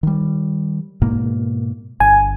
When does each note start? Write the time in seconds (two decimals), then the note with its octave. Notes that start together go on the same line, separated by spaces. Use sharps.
0.03 D#3 G3
1.02 G#2 B2 A#3
2.00 G1 G#5